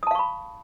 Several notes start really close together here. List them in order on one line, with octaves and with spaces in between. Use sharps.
D#6 A5 F5 C#6 B5